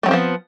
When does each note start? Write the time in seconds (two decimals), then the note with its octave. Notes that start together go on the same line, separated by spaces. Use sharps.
0.03 A3
0.06 F#3
0.08 C4
0.11 F3
0.13 B3